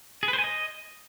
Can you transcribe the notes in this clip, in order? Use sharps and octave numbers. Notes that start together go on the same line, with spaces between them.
G#4
B4
C5
G#5
D#5